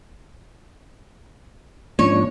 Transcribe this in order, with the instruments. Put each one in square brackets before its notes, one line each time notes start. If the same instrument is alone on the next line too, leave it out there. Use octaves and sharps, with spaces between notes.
[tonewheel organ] G#2 F3 D4 [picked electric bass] A#3 C#4 [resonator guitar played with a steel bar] C#5